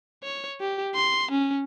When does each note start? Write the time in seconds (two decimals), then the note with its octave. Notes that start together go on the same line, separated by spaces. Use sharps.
0.24 C#5
0.60 G4
0.95 C6
1.31 C#4